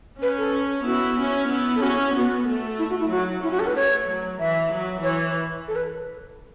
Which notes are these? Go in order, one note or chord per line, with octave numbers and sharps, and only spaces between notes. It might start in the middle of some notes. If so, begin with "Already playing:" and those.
C#4 B4
A4
B3 E4 F#4
C#4
B3 E4
A4
C#4 F#4
B3 F#4
A3
E4
F#4
E4
F#3 F#4
C#4 E4
F#4
A4
B4
A3 C#5
F#3
E3 E5
F#3
E3 C#5
A4
B4